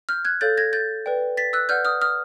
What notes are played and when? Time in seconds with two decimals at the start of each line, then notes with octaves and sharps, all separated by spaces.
0.09 F6 G6
0.25 F#6 G#6
0.41 A4 C#5 F5 G6 A6
0.57 G#6 A#6
0.73 G6 A6
1.06 B4 D5 G5
1.37 A6 B6
1.53 E6 F#6
1.69 B4 D5 F#5 F6 G6
1.85 D#6 F6
2.01 D#6 F6